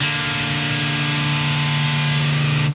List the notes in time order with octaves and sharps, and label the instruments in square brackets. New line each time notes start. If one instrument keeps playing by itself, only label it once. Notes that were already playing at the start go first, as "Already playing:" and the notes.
[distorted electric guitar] D3 A#3